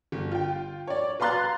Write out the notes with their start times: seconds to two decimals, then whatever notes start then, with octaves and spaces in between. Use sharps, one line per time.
0.12 G1
0.32 F4 G5
0.88 C#5 D5
1.20 B4 F5 A#5 C6 F#6 A6